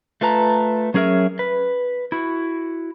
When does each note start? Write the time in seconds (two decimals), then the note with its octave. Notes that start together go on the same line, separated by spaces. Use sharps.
0.21 A3 F4 B4 A5 A#5
0.94 F#3 C#4 G#4 A#4 E5
1.39 B4
2.12 E4 F#4